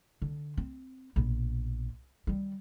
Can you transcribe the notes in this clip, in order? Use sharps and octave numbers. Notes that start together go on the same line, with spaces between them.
D3
C4
A#1 B2
D#3 G3